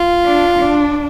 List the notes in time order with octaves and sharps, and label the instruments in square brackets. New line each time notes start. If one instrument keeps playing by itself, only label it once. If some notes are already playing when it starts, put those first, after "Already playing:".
Already playing: [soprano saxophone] F4
[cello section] D4
D4